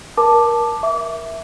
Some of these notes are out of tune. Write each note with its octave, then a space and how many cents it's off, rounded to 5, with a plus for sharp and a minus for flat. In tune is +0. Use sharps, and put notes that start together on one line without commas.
A#4 +20 A5 +0 D6 +15
E5 +0 D6 -35